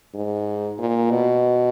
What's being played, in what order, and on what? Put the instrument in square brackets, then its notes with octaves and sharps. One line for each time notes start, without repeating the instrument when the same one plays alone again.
[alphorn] G#2
A#2
B2